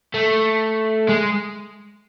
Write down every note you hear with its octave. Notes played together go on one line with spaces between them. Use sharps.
A3
G#3